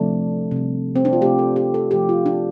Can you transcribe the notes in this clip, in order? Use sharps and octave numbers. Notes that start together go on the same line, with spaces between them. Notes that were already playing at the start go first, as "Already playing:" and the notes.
Already playing: C3 F3 A3 D4
C3 G3
C4
D4
F4
C3 A3 G4
A4
G4
A4
C3 F3 A3 G4
F4
D4